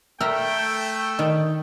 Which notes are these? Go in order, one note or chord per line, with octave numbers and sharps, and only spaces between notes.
A3 A#4 E5 G5 A#5
D#3